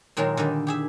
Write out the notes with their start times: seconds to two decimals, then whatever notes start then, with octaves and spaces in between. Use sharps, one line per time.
0.17 A#2 D#3 F#3 G#3 F4 A#4
0.37 D3 D#3 G3
0.67 G4 G#4 E5